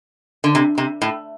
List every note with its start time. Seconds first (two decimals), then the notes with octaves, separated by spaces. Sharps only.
0.44 D3
0.55 C3
0.78 C3
1.02 A2